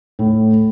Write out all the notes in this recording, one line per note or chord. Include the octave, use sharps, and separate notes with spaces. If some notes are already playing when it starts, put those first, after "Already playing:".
A2